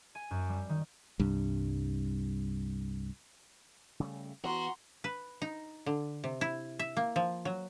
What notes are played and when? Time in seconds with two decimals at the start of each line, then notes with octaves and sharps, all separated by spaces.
0.15 G#5
0.31 F#2
0.49 G3
0.69 D#3
1.20 C2 G2
4.00 C#3 G3 A3
4.44 E3 B3 F#4 A#5 C6
5.04 B4
5.42 D#4
5.86 D3
6.24 C3
6.41 E4
6.79 E5
6.97 A#3
7.16 F3
7.45 F#3